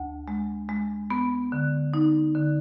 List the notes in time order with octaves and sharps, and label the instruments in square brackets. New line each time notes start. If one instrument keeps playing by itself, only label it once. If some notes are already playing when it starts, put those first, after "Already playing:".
Already playing: [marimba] D2
G#3
G#3
B3
D3
D#4
D3